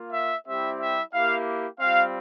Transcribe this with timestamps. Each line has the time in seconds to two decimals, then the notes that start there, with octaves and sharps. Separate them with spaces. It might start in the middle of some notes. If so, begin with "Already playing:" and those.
Already playing: A#3 F4
0.13 E5
0.47 G3 C4 E4 G4 E5
0.80 E5
1.14 A#3 E4 G4 F5
1.80 G3 C4 F4 F5